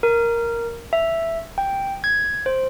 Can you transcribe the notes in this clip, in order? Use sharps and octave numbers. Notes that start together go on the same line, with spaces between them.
A#4
E5
G5
G#6
C5